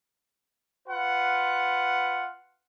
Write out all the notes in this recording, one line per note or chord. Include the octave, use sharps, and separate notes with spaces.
F4 B4 F#5